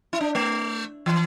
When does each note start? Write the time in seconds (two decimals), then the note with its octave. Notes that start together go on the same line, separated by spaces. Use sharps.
0.13 E4
0.21 D4
0.35 A3
1.06 E3